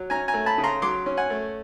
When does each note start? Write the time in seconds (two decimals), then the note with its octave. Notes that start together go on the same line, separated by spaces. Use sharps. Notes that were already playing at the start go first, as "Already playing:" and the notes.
Already playing: F#3
0.10 C#4 G#5 A#5
0.28 G#5 A#5
0.34 A3
0.46 A5 B5
0.58 C#3
0.64 A#5 C6
0.82 F#3 C6 D6
1.06 C#4
1.17 F#5 G#5
1.30 A3